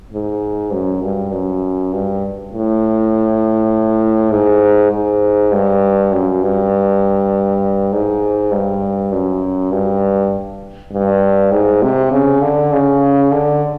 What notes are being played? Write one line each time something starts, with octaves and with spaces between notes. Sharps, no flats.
G#2
F#2
G2
F#2
G2
A2
G#2
G#2
G2
F#2
G2
G#2
G2
F#2
G2
G2
G#2
C3
C#3
D3
C#3
D3